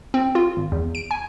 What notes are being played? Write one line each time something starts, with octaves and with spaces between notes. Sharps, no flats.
C4
F4
G#1
E2
D7
G#5